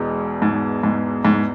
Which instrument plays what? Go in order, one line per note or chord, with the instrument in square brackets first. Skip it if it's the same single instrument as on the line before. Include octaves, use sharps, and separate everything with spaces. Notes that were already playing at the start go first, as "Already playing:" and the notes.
Already playing: [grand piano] E1 E2 B2 G#3
[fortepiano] G#2
G#2
G#2